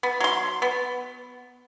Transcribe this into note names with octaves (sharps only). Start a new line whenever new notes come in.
B3
F#3 C6
B3